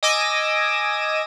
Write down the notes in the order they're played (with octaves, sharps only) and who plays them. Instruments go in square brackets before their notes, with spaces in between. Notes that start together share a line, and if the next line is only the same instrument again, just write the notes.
[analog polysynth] D#5 G#5 D6 E6 A#6 D#7